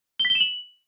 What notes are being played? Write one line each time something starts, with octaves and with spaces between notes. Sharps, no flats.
G7
B6
G7
E7
F#7